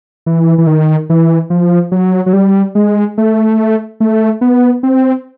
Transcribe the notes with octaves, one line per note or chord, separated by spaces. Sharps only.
E3
E3
D#3
E3
F3
F#3
F#3
G3
G#3
A3
A3
B3
C4